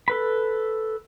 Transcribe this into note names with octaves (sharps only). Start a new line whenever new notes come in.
A4 B4 B5